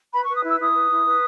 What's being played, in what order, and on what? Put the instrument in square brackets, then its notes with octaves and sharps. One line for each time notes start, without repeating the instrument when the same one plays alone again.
[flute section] B4 B5
C#6
B4
D#6
E4 E6
E4 D#6
B4
E4
B4